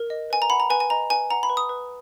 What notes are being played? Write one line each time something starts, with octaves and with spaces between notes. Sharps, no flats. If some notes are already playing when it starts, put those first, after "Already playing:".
Already playing: A#4
D#5
B4 G#5
A#5
F#5 B5
A#5
B4 G#5
G#5
D#5 A#5
B4 G#5
F#5 A#5
B5
B4
D#6
B4